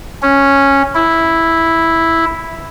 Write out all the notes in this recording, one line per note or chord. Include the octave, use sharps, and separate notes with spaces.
C#4
E4